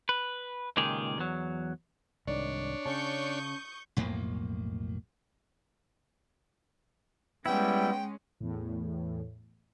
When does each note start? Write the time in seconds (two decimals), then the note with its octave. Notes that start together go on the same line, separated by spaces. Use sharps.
0.09 B4
0.77 C#2 A#2 D#3 G4 G#4
1.18 E2 F#3
2.27 C2 G#2 D#3 D4 C#5 D5
2.86 C#3 C#4 A5 C#6 D#6 G6
3.97 B1 F2 A2 A#3
7.46 G3 G#3 B3 C#4 E4 G5
8.40 E2 A2